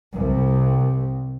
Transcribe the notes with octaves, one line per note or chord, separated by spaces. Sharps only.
C2